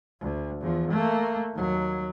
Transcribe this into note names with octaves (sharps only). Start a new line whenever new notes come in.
D2
E2 F3
A3 A#3
D#2 F#3